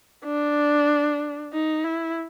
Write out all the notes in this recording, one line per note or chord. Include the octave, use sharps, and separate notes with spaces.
D4
D#4
E4